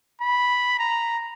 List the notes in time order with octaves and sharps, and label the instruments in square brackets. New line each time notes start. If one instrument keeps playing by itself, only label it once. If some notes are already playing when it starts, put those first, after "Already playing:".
[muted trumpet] B5
A#5